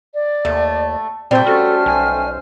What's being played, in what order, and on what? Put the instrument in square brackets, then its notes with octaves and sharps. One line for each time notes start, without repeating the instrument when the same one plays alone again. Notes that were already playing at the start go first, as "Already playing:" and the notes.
[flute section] D5
[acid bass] D#2 [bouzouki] A3
[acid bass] A#2 [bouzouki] G3 A3 [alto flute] C4
[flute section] C#4 C5 F6 [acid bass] F#4 [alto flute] A4
[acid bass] B1 [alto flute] G#5